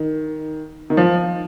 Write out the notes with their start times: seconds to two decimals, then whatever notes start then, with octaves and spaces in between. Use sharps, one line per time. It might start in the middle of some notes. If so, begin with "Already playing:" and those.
Already playing: D#3
0.90 D#3
0.97 F3